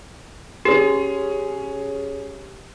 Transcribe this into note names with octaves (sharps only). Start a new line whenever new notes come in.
C#4 G4 G#4